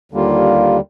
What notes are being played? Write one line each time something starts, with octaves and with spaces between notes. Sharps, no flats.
D#2 D3 G3 A#3 F4